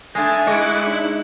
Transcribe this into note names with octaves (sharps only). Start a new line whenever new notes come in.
G#3 A3 D4 G#5
G#3 E4 D#5 F#5 C#6 D6
D4 D#4